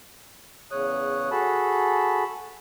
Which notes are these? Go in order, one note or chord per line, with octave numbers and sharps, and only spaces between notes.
E2 C#3 C#5 D#6 F#6
F#4 G#4 A4 A5 B5